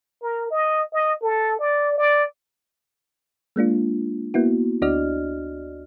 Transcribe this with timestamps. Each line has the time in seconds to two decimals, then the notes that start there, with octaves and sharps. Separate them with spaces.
0.22 A#4
0.51 D#5
0.93 D#5
1.22 A4
1.59 D5
1.98 D5
3.56 G#3 A#3 D4 F4
4.34 A#3 B3 E4 F#4
4.82 D2 D4 F#4 D5 D#5 F6